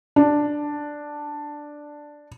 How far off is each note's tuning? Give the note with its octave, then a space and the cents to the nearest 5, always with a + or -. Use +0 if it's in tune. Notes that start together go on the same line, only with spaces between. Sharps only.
D4 +5